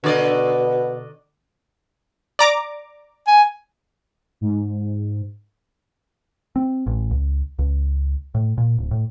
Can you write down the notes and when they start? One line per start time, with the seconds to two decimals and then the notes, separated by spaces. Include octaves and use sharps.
0.04 B2 D3 D5 D#5
2.39 D5 A#5 D6
3.27 G#5
4.41 G#2
6.56 C4
6.87 A1
7.11 C#2
7.59 C#2
8.35 A2
8.58 A#2
8.78 D1
8.91 A2